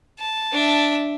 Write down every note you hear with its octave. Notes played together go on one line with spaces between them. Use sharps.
A5
D4 E5